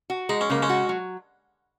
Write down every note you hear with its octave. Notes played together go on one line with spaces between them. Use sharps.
F#4
G#3 D#4
C#4
C#3 A#3
G#3 C#4
F#4
F#3